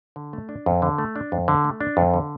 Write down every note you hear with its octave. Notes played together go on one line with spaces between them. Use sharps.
D3
A3
D4
F2
D3
A3
D4
F2
D3
A3
D4
F2
D3